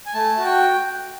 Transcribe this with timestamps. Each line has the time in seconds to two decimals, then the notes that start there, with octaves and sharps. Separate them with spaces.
0.06 G#5
0.14 A3 A5
0.38 F#4
0.44 G5